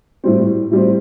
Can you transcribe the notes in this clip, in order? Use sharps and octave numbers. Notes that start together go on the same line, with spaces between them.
A2 G3 C4
A2 G3 C4